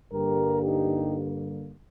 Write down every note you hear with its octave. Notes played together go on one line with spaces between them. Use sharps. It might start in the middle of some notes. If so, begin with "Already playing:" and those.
G2 D3 G3 A#3 G4 A#4
D#4 G4